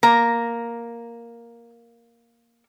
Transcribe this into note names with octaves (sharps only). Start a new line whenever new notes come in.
A#3 A#5